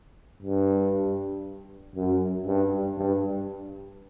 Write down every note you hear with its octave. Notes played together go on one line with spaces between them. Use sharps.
G2
F#2
G2
G2